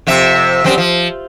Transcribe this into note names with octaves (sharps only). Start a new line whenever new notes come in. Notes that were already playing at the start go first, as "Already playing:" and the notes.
F2 C3 E5
F#2 G3 C4
F3